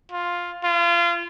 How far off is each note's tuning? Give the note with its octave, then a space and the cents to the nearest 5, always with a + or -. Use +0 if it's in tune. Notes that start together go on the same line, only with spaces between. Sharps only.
F4 +5
F4 -30